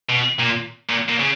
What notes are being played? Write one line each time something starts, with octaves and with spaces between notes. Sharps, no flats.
B2
A#2
A#2
A#2
C#3